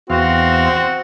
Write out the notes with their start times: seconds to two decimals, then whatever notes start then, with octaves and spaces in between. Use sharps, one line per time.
0.10 E2 C4 F#4 F5